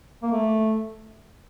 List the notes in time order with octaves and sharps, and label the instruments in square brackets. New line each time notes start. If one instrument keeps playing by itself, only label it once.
[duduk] A#3
A3